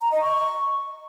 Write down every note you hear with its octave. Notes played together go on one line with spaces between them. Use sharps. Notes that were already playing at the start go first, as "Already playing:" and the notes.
A#5
D#5
C#6